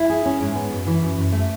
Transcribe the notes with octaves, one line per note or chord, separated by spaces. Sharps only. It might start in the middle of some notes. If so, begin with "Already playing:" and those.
Already playing: E4
G#4
C#4
G#2
B3
F#2
E3
F#2
F#2
A3